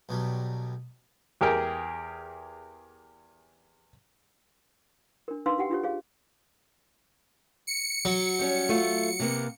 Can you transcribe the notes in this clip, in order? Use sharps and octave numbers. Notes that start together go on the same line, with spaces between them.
B1 B2 F#3 G3
E2 G4 G#4 A#4 G5
D4 A#4
D4 D#4 B4 F5 C6 E6
F#4 G4 F#5 G5
D4 F4 G4 C#5
G#4 C#5 F5
C#7
F#3
G3 C#4
A3 F4
C3 A#3 B3